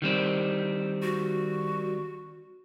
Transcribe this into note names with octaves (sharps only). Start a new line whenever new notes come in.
D#3 G3 C4
F#4